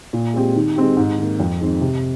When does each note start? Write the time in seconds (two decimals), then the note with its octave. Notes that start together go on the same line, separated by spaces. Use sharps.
0.13 A#2
0.34 G#3 C4 G4
0.56 D#3
0.76 G#3 C4 G4
0.97 G#2
1.18 D#3 A#3
1.40 F2
1.61 D#3 G#3 C4
1.81 C3